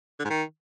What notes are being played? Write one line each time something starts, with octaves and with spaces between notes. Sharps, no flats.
D3
G#2
D#3